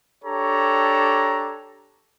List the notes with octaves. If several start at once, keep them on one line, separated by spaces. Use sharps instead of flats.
D4 G4 A4 C#5 A#5